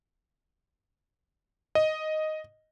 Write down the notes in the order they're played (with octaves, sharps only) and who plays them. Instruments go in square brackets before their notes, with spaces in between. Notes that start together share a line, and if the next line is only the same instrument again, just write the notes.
[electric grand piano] D#5